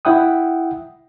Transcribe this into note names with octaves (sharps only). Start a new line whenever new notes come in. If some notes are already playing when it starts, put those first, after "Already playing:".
E4 E5 F#5 G5 D#6